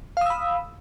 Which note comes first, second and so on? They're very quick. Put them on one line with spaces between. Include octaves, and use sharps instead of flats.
F5 D#6 E6 B5